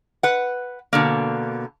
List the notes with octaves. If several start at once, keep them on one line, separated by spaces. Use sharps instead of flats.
B4 F#5
B2 D3 A#3